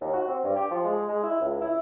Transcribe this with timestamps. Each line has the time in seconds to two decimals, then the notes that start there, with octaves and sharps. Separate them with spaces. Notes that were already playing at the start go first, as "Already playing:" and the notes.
0.01 D#2
0.13 F#4
0.28 C4
0.44 G2
0.56 G4
0.71 F3
0.84 G#3
1.08 G#3
1.23 E4
1.41 C#2
1.61 E4